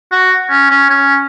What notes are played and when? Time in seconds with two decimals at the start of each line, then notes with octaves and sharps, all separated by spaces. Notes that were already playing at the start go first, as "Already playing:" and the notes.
0.12 F#4
0.50 C#4
0.70 C#4
0.90 C#4